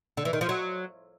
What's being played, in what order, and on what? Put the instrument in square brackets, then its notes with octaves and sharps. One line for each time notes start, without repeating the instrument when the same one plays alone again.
[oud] D3
E3
D#3
F3
F#3